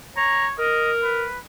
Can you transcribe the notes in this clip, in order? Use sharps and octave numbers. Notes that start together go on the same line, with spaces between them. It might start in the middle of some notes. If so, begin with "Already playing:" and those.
C#5 A#5
A#4 D#5
B4